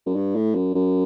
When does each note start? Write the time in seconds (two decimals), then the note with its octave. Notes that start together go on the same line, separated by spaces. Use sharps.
0.06 F#2
0.16 G2
0.35 A2
0.55 F#2
0.74 F#2